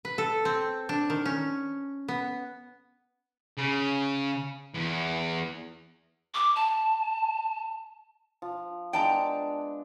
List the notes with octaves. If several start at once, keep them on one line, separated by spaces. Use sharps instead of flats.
B4
A4
C4
D4
D#3
C#4
B3
C#3
E2
D6
A5
F3
G#3 B3 D4 G5 A5 A#5